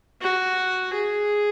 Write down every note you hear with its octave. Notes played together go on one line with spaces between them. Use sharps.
F#4
G#4